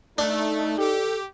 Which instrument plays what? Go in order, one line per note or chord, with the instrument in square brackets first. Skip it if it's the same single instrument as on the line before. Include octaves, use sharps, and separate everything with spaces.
[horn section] A3 [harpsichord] D4 [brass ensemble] D#4
[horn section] G4 [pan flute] A4